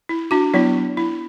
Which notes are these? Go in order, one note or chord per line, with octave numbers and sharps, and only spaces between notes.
E4
D4 F#4
F#3 B3 D4 E4
E4